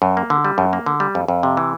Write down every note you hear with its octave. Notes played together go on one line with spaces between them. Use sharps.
F#2
A#3
D3
G3
F#2
A#3
D3
G3
F2
F2
C3
E3